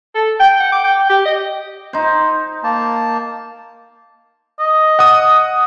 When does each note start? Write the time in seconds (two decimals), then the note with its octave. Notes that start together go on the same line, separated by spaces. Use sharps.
0.15 A4
0.40 G5
0.60 F#5
0.72 D6
0.84 G5
1.09 G4
1.25 D#5
1.93 D#4 C5
2.63 A#3 A5
4.59 D#5
4.99 F#5 D#6